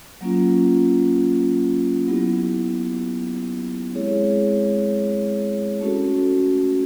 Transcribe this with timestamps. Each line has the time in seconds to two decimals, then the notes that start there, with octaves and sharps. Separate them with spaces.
0.21 F#3 A#3 C#4 F4
2.08 F#3 B3 E4 G4
3.94 G#3 C4 E4 G#4 C#5
5.81 A3 C#4 F#4 A4